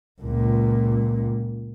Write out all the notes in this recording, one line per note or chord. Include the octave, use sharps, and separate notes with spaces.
C#2 A#2